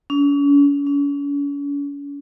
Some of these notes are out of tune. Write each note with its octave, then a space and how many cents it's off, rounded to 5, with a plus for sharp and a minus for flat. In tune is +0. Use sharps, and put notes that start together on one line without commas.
C#4 +45
C#4 +45